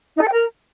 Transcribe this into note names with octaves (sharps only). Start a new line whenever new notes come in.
D#4
A4
G5
A#4